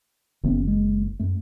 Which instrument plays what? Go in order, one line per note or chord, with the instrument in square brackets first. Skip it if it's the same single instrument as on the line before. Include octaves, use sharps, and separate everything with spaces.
[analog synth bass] F#1 [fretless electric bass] D#3 B3 C#4
[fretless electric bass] G#3
F#2 A3